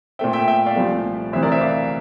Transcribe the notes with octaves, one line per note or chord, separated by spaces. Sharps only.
A#2 A3 C4 E5 G5
E5 G5
E5 G5
D5 F5
C2 A#2 F3 A3
D2 C3 E3 C5 E5
A#4 D5
C5 E5
D5 F5